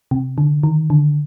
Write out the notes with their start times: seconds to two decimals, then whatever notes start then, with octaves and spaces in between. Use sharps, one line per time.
0.11 C3
0.38 D3
0.63 D#3
0.90 D3